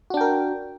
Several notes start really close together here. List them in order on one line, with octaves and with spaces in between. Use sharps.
F#4 D4 G5 A#4